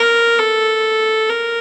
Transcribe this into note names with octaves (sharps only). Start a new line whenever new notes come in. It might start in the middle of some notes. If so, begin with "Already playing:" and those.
Already playing: A#4
A4
A#4